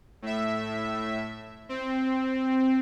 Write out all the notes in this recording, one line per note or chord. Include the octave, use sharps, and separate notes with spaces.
A2 E5
C4